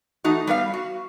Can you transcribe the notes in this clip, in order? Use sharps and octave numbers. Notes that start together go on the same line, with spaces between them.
E3 A3 D#4 F#4
G3 B3 B4 F5
F#4